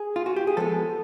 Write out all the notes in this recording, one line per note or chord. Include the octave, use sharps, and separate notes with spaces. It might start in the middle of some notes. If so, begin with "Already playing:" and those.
Already playing: G#4
F4
F#4
G4
G#4
F3 G#3 B3 A4